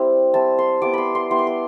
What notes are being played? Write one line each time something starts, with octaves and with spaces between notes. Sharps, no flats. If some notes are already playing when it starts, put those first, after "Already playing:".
Already playing: G3 C4 E4
G3 C4 E4 A5
C6
G3 B3 E4 D6
B5 C6
C6
G3 B3 E4 C6
D6
C6